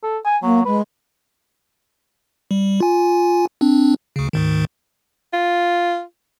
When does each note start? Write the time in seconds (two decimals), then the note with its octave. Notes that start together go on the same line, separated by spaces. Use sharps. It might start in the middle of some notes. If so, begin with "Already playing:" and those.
0.03 A4
0.25 G#5
0.43 F#3 A#3
0.65 G#3 B4
2.51 G3
2.80 F4 G#5
3.61 C4 D4
4.16 D2 C#3
4.33 D2 G#2 D#3
5.33 F4